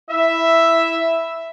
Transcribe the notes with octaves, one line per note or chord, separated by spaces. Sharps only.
E4 E5